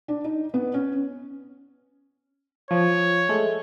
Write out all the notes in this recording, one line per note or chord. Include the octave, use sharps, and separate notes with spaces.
D4
D#4
B3
C#4
F3 C#5
G#3 A3